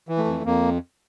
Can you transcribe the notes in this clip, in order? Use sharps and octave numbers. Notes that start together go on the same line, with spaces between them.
E3
A3
F2
F2 A#3